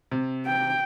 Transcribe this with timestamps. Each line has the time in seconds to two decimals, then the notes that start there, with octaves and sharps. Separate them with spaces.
0.11 C3
0.46 G5